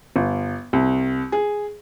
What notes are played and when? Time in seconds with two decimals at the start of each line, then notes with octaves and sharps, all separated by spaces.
0.16 G1
0.73 C2
1.32 G#4